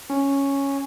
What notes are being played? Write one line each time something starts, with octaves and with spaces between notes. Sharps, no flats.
C#4